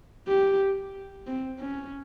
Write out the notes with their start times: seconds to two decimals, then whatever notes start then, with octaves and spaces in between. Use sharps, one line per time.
0.28 G4
1.27 C4
1.59 C#4